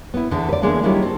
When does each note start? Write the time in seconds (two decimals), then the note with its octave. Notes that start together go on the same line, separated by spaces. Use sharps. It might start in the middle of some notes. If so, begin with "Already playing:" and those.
0.14 B3 E4
0.31 E2 D3 E3
0.48 B4 D5
0.62 D3 E3 G#3 A#3 B3 D4
0.83 D#3 F#3 G3 A#3 D4 E4
1.02 C4 A4